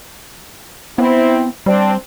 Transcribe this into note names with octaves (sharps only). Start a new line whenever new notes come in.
B3 C4 E4
G3 C4 D4 D5